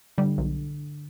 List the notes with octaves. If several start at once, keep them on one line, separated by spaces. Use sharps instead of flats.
D3 G3
B1